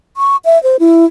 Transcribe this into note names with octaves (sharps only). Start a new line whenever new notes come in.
C#6
E5
C5
E4